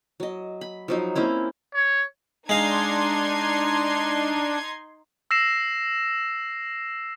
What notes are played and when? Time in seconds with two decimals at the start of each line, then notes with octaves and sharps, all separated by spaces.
0.20 F#3 D#5
0.61 B5
0.88 F3 F#3 D#4
1.15 A#3 C4 C#4 E4
1.74 C#5
2.49 G#3 D4 D#4 F5 C6 G#6
5.31 E6 A#6 C7 E7